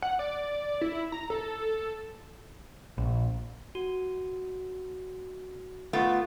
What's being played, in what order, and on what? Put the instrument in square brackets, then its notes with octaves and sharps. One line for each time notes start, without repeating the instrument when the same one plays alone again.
[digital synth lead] F#5
D5
E4
A#5
A4
[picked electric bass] A#1
[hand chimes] F#4
[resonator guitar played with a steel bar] A3 B3 F4